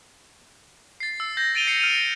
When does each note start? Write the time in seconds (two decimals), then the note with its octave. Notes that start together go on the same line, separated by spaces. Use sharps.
1.00 A6 C7
1.20 E6
1.37 G6 A#6
1.55 A6 D7 D#7 F7 G7
1.67 A#6 C7 C#7
1.80 F6 C#7 D#7 F7